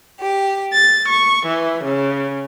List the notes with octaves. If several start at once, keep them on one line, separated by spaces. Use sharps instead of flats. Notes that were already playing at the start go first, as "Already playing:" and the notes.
G4
A6
C#6
E3
C#3